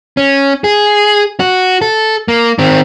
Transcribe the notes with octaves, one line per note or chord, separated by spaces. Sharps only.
C#4
G#4
F#4
A4
A#3
D#3 C4